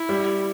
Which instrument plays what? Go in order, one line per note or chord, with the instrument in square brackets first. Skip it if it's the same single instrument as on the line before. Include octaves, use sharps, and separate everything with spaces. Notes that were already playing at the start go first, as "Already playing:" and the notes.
Already playing: [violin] E4
[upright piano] G3